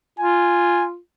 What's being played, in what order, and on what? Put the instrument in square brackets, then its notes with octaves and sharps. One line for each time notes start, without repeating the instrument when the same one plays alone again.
[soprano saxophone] F4 [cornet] G#5